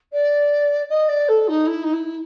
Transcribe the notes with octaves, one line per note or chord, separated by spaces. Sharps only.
D5
D#5
D5
A4
D#4
E4
D#4
E4